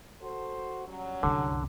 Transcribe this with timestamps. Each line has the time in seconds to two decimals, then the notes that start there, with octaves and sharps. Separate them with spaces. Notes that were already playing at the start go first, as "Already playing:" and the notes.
0.21 F#4 A4 C5
0.86 F#3 G3 C#4
1.23 C2 F#2 D3